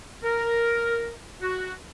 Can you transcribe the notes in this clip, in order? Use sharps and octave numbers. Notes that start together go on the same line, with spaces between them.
A#4
F#4